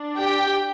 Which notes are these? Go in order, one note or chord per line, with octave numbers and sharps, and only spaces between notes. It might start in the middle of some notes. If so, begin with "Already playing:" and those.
Already playing: D4
G4 G5